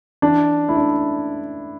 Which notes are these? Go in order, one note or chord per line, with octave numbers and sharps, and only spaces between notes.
E3 D4
A3 E4
D4